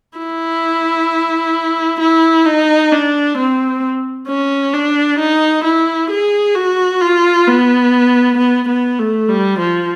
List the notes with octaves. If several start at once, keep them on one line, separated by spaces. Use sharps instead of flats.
E4
E4
D#4
D4
C4
C#4
D4
D#4
E4
G#4
F#4
F4
B3
B3
B3
A3
G3
F3